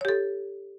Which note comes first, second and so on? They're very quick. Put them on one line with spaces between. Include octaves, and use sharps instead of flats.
C#5 G4 A4